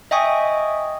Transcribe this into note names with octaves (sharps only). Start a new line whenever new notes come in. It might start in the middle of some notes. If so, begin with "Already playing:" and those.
D#5 E5 G5 G#5 C#6 D#6